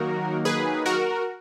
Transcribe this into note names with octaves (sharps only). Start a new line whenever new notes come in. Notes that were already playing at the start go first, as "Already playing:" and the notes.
Already playing: D#3 F#3 A#3 D#4 F#4 A#4
G#4 B4
F#4 A#4